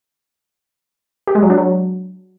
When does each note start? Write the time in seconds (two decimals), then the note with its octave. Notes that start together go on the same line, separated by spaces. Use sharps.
1.27 G4
1.35 G#3
1.42 F#3
1.50 D4
1.58 F#3